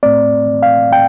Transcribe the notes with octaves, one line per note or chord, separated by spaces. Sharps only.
A2 A3 C4 D5
F5
G5